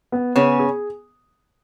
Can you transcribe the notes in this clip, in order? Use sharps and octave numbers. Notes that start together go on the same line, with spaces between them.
B3
C#3 B3 C#4
G#4